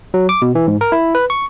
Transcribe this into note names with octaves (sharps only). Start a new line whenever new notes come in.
F#3
D6
B2
E3
G#2
A#4
E4
B4
C#6